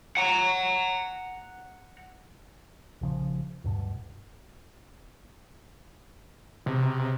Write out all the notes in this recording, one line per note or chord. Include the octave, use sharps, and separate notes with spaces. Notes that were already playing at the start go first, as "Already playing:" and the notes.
F#5 A#5
A#1 C#3 F3
D1 G2 B2
C3